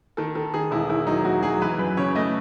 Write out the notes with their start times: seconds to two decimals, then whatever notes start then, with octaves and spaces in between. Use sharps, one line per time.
0.17 D#3 A4
0.35 D#3 A4
0.54 D#3 G#4
0.71 E1 E4
0.89 D#3 E4
1.07 F#3 D#4
1.25 F#3 F#4
1.43 F#3 G#4
1.62 E3 B4
1.79 F#2 B4
1.97 C#3 C#5
2.15 A3 D#5